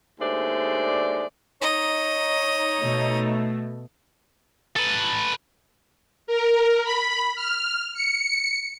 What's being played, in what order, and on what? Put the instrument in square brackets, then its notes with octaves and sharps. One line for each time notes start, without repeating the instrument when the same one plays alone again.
[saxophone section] D#2 G#3 A3 D4 C5 D5
[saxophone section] D#4 C#5 [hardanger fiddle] D#5
[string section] B2 A3
[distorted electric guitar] A4 B4
[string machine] A#4
B5
F6
C#7